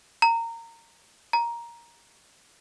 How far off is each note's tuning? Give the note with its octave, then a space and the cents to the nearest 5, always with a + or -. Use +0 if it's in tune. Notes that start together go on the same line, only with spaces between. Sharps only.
A#5 -20
A#5 +10